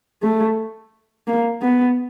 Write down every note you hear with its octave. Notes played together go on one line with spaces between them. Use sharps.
A3
A#3
B3